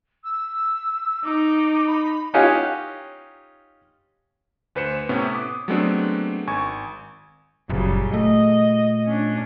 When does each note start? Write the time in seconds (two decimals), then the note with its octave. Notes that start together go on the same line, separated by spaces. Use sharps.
0.24 E6
1.24 D#4 D6
1.87 B5
2.34 C#4 D#4 F4 G4 F#5 G#5
4.75 D2 B4 C5 C#7 E7
5.09 A2 C3 B3 C#4 E4
5.34 D6 D#6
5.68 F#3 G#3 A3 B3 C4 D4
6.47 G#1 G#5 C#6 G#6
7.70 F#1 A#2 C#3 F#3 G3
8.14 A3 D#5
9.06 C#4 D4